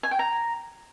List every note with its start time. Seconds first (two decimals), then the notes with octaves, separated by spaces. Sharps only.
0.03 G#5
0.11 G5
0.19 A#5